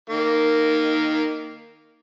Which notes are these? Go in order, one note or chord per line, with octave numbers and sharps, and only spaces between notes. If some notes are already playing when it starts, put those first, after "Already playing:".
D#3 A#3